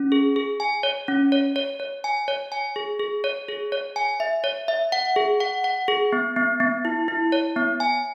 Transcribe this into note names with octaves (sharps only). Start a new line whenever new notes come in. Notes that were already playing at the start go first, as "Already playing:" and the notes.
Already playing: C#4
G#4
G#4
G#5
C#5
C#4
C#5
C#5
C#5
G#5
C#5
G#5
G#4
G#4
C#5
G#4
C#5
G#5
E5
C#5
E5
F#5
G#4
F#5
F#5
G#4
B3
B3
B3
E4
E4
C#5
B3
G#5